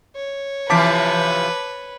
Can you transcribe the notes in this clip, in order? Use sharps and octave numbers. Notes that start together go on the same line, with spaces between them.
C#5
C3 E3 F3 B4 A5 D6 B6